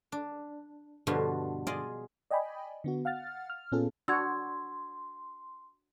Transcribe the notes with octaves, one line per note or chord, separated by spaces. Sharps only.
D4
G2 B2 D3 F3 F4 F#4
F4 G#4 D5 D#5
D5 D#5 G5 G#5 B5
D3 B3 F#4
F5 F#5 F6 A6
F6
A#2 B3 C#4 F4 G#4 A4
D4 F#4 C6 E6 G#6